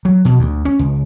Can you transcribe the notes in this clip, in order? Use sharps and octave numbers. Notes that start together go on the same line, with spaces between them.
F#3
B2
D2
C#4
C#2